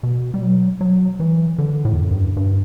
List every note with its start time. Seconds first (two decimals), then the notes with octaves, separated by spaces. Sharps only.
0.03 B2
0.34 G3
0.42 F#3
0.81 F#3
1.20 E3
1.58 D3
1.85 A2
1.93 E2
2.02 F#2
2.11 G2
2.37 G2